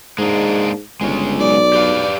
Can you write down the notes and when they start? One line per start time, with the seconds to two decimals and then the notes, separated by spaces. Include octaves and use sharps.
0.18 G#2 G#3 A#3 D4
1.01 G1 G#3 C#4
1.40 B1 D5
1.73 G4 B4 F5